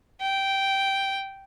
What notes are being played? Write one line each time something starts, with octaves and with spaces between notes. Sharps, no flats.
G5